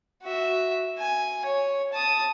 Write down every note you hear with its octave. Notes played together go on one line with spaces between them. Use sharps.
F#4 E5
G#5
C#5
A5 D#6